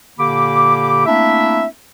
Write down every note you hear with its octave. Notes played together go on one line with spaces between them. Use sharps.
A#2 D3 A#3 G4 B5 D6
A3 A#3 C4 D4 E4 E5